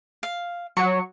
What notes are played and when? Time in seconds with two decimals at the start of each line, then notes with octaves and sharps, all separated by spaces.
0.23 F5
0.77 F#3 C#6